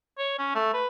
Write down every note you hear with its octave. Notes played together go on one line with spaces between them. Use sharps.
C#5
C#4
A3
B4